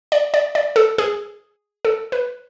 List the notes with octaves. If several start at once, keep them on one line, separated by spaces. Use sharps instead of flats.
D5
D5
D5
A4
G#4
A4
B4